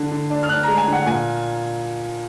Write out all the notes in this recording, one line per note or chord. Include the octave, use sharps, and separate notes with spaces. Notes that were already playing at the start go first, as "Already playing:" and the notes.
Already playing: D3
D3
D4
F6
D4 F#6
G#3 A#5
G#5
D3 F#5
A#2 G#5